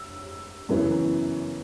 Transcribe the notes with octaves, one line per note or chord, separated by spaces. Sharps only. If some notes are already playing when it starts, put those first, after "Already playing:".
Already playing: E6
F#2 C#3 E3 B3